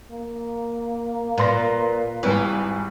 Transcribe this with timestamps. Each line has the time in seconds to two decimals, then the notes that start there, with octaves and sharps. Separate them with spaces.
0.12 A#3
1.38 A#2 B4 C6 A#6
2.23 G#1 E3 G3 G#5